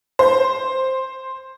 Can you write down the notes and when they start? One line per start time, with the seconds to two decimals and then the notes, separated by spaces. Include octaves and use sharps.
0.19 C5